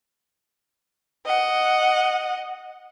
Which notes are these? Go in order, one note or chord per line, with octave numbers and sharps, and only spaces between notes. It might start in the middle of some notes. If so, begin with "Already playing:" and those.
D#5 F#5